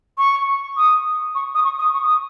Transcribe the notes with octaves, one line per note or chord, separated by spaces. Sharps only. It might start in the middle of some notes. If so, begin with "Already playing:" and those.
C#6
D#6
C#6
D#6
C#6
D#6
C#6
D#6